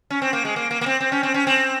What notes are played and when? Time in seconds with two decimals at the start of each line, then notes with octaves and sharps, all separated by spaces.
0.10 C#4
0.22 C4
0.33 A#3
0.45 G#3
0.56 A#3
0.71 A#3
0.81 A#3
0.86 C4
1.01 C4
1.12 C#4
1.23 C4
1.34 C#4
1.47 C4